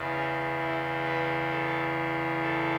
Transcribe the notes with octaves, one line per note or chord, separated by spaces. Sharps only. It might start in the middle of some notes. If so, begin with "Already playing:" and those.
Already playing: E2 C#3 E3
C#4
E4
B4
A4
A4